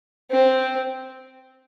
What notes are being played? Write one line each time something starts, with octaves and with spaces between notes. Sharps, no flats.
C4